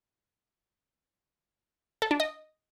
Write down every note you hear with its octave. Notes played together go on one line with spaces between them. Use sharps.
A4
D4
D#5